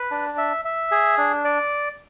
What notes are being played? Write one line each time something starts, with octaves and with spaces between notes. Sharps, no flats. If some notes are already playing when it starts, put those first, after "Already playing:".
Already playing: B4
D4
E5
E5
G#4
D4
D5